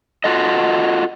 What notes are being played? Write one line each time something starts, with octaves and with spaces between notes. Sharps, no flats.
F4 F#4 A4 D#5